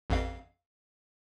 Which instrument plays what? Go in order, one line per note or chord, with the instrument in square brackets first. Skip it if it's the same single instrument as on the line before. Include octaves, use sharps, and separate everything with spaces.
[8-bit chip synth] A1 F2 F5